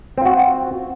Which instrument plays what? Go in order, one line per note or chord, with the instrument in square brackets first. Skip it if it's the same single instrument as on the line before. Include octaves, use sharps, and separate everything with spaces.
[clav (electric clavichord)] C4
F4
F#4